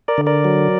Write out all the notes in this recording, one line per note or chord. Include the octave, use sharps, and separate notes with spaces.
A#4 D5
D3
A#4 D5
F#3